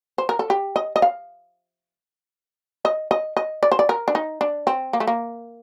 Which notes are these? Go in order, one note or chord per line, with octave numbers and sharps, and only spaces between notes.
C5
A#4
A4
G4
D#5
D#5
F5
D#5
D#5
D#5
D5
C5
D5
A#4
D4
D#4
D4
C4
A#3
A3
A#3